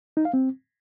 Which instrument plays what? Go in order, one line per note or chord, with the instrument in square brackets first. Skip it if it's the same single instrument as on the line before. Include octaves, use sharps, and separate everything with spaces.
[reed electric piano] D#4
F5
C4